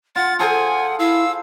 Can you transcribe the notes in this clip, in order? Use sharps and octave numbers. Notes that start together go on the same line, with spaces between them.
F4 F#5 A6
G#4 A4 C5 F#5 G#5
E4 F5 E6